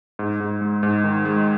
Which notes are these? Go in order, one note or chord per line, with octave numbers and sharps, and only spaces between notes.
G#2
G#2
G#3
G#2
D#3
G#3